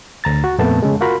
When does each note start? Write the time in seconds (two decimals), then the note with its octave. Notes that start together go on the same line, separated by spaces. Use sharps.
0.24 D2 A#5 A6
0.44 F#4
0.59 F2 A#2 A3 B3 A5
0.82 C#3 G#3
1.01 F4 F#4 A#4 B5 C6